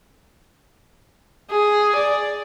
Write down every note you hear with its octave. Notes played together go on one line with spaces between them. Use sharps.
G#4
D5